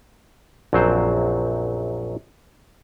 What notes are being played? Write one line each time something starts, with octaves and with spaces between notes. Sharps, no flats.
A#1 F#2 F#3 C4 C5